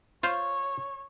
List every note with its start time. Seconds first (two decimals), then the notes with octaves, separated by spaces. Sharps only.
0.23 F4 C5 C#5 F5